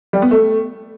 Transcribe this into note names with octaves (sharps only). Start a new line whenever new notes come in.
G3
B3
A3